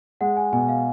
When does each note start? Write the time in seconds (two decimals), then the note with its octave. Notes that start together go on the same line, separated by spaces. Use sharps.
0.21 G#3 F#5
0.37 G#5
0.52 B2 G#5
0.69 F5